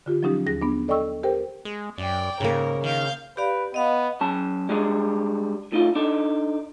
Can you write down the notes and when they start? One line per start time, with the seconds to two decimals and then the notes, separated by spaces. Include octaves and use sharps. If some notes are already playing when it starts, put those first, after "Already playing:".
0.06 D3 F4 G4
0.23 F3 F#3 C#4 D#4 G4
0.46 D#2 G#4 A#6
0.62 B3 D4
0.88 A4 D5 D#5 G5 C#6 E6
1.23 G4 A#4 C5 G5
1.65 G#3
1.98 F#2 D5 G5
2.40 G#2 C#3 A#3 A#4
2.83 D#3 F5 G6
3.37 G4 B4 D5 F5
3.74 B3 D#5 F5
4.21 F#3 C#4 A5
4.69 G3 G#3 D4 G#4
5.72 A2 D#4 F4
5.95 D4 D#4 A4